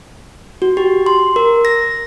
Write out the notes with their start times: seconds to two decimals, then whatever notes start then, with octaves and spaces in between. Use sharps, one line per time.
0.62 F#4
0.77 G4
1.06 C6
1.36 A#4
1.65 A#6